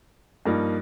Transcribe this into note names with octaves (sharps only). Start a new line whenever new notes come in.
G2 F3 A#3 D#4